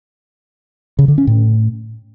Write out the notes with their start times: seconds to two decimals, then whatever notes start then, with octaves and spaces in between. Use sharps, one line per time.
0.99 C#3
1.08 D3
1.18 C#4
1.27 A2